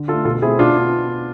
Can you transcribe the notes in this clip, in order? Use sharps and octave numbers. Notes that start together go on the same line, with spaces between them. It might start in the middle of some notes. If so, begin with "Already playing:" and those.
Already playing: D3
D4 F4 A4
A3
B2 F4 A4
A3 C4 E4 G#4
B2 D4 F4
B3 D4